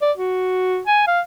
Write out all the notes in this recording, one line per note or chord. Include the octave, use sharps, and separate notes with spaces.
D5
F#4
G#5
F5